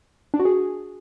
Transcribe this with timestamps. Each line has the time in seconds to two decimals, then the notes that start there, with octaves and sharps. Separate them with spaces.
0.34 D4
0.39 F#4
0.45 G#4